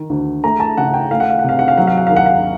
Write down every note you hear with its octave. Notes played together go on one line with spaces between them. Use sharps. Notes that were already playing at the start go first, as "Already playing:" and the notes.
Already playing: D#3
D2
A3 A#5
A5
C#3 F#5
G5
A3 F5
F#5
F5
F#5
C3 F5
F#5
F5
F#3 F#5
F5
F#5
D#2 F5
F#5
F5